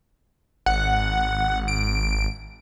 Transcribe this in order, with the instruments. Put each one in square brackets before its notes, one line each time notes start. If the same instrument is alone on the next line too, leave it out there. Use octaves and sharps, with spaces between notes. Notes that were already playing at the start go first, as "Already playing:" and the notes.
[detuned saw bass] G#1 [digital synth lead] F#5
[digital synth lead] D7